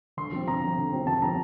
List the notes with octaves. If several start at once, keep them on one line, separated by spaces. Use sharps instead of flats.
D3 C6
F3 C4
D3 A#5
F3 C4
D3
F3 C4
D3 A5
F3 C4 A#5